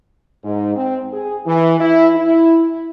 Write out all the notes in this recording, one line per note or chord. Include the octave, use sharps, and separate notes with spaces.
G#2
C4
G#4
E3
E4
E4